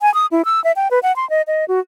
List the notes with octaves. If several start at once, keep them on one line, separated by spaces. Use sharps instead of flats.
G#5
D#6
E4
E6
E5
G5
B4
F#5
C6
D#5
D#5
F#4